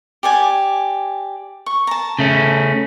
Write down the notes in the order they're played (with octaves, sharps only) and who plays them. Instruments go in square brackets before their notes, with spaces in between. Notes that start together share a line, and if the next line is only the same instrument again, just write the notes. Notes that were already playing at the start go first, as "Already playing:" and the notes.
[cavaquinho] G4 D5 G#5
C#6
A5 A#5
[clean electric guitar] C#3 A3 C#4